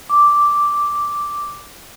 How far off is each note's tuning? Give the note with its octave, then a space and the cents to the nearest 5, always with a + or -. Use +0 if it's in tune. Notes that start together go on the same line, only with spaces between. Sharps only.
D6 -5